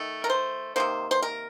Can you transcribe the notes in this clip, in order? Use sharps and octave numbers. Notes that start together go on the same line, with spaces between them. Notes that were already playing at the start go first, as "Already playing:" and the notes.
Already playing: D#3 A3
A#4
C5
C3 D#3 A#3 C5
C5
A#4